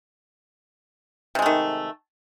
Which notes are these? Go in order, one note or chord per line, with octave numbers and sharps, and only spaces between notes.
C3 D#3 G#3 A3